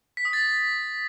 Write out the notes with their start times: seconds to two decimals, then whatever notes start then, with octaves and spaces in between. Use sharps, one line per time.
0.17 B6
0.25 D#6
0.33 A6